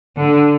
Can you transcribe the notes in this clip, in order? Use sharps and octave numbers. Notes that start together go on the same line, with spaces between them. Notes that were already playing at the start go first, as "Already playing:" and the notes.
D3